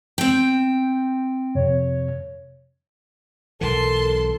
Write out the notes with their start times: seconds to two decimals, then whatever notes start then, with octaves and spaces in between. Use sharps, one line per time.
0.18 C4 G5
1.55 F2 C3 C#5
3.61 B1 E3 A4 A#4 A5 C6